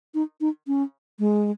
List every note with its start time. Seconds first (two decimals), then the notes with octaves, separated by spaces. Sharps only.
0.14 D#4
0.41 D#4
0.67 C#4
1.19 G#3